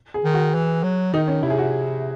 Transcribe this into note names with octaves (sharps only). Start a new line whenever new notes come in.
G#4
D#3
F#4
E3
F#3
D#3 D#4
C#4
C3 E4
G#4
F#4